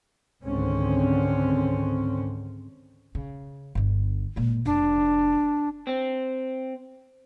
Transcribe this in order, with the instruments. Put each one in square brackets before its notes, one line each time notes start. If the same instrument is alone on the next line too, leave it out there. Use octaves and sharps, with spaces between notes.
[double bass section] C#2 G#2 D3 D#3 C4 C#4
[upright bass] C#3
G1 D3
A#2 G#3
[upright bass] F1 [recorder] D4
[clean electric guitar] C4